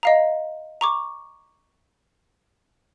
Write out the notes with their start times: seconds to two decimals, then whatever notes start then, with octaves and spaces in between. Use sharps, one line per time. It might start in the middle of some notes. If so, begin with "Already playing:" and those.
0.03 D#5 F5 A#5
0.81 A#5 C#6 D6